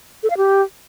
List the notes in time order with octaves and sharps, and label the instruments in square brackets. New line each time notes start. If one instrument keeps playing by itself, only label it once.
[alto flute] A4
F5
G4